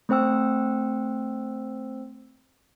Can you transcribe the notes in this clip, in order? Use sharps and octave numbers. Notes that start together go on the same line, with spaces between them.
A3 C4 C5 G5 E6